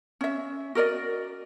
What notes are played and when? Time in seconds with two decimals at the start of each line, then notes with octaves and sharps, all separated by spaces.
0.21 C#4 E5
0.75 F#4 A#4 D5 D#5